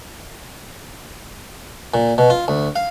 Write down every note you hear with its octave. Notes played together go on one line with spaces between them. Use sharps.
A#2
B2
F4
D2
F5